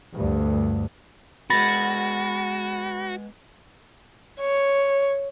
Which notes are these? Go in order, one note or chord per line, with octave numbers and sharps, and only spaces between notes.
D2 G2
G#3 B3 F#4 B5 A6 A#6
C#5